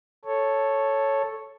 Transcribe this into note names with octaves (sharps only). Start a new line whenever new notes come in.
A4 C#5